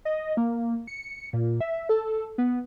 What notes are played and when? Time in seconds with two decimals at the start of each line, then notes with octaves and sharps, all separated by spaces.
0.05 D#5
0.37 A#3
0.87 C#7
1.33 A#2
1.60 E5
1.89 A4
2.38 B3